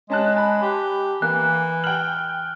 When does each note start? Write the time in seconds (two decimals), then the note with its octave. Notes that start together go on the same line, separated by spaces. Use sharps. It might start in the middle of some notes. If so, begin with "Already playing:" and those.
0.10 G#3 C#4 A5 F#6
0.36 G#5 A5 B5
0.62 G4
1.22 E3 A#3 F#6
1.84 G5 F6 F#7